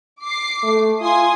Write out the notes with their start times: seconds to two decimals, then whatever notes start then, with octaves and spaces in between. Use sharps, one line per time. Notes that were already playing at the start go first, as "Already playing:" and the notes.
0.23 D6 C7
0.63 A3
1.01 F4 G#5 C6 D#6